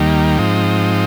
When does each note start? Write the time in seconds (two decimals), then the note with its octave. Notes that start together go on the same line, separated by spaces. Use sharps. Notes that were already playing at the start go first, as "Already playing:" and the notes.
Already playing: D#2 D#3 G3 A#3
0.38 G#2 F3 C4 D#4